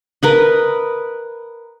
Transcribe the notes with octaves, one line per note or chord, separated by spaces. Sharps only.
A#4 B4 D#5